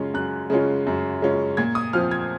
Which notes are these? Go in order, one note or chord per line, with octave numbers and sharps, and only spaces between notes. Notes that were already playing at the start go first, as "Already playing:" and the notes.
Already playing: F#2 C#3 G#3 C#4 F4
F#2 F#6
C#3 G#3 C#4 F4
F#2
C#3 G#3 C#4 F4
A#2 G#6
D#6
F3 C4 F4 F6
G#6